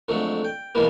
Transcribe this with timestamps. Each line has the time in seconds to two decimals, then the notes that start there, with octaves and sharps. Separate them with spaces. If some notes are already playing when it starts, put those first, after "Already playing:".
0.08 F2 D3 F#3 G#3 A3
0.45 G5
0.75 B2 E3 G3 G#3 A#3